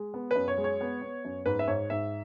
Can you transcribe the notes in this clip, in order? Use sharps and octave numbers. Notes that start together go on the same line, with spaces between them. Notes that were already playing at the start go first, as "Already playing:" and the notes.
Already playing: G#3
B3
F#2 B4
C#5
G#3
C#5
B3
B3
F#2
G#2 B4
E5
G#2 C#5
G#2 E5